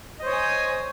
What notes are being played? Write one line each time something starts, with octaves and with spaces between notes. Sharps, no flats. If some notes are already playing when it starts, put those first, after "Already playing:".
C5 C#5 D#5 G#5 D#6